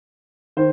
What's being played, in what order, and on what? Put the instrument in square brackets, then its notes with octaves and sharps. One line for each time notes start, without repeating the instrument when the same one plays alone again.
[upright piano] D#3 C5